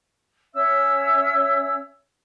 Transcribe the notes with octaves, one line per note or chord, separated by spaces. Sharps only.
C#4 C#5 E5 E6